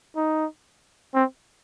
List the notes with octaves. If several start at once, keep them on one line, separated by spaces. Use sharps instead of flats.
D#4
C4